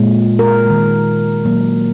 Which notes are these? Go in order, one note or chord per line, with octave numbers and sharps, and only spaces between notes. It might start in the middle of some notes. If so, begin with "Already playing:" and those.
Already playing: A#2 G#3
A#4
D#3 G#3
A#2 F#3 A#3